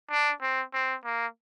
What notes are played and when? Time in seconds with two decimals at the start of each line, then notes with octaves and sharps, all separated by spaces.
0.11 D4
0.41 C4
0.73 C4
1.04 A#3